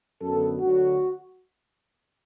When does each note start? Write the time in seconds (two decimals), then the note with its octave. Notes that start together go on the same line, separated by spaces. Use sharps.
0.22 F#2 D3 B3 A4
0.59 D2 D3 F#3 F#4